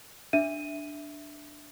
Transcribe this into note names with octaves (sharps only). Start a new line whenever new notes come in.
D4 E5 D#7